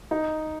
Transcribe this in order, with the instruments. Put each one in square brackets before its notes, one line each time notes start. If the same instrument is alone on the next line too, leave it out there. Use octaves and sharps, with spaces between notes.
[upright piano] D#4